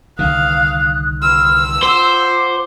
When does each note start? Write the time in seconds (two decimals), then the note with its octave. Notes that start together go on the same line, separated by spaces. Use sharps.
0.19 C2 D3 D#3 F5 D#6 F#6
1.22 B5 C6 E6 F6
1.83 F4 C5 F#5 D6